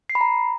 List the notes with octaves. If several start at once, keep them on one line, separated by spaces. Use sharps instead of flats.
C7
B5
A#5